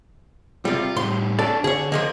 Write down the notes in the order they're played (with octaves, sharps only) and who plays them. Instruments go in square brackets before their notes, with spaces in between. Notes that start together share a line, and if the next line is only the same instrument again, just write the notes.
[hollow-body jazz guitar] C3 G3 [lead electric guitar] F4
[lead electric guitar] A2 G3 [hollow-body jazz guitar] C6
[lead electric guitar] D4 C#5 [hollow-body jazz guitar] A4 D5 A5
[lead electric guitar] D3 [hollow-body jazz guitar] G#4 C#5
[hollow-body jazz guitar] F3 G#3 A#3 [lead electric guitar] D#5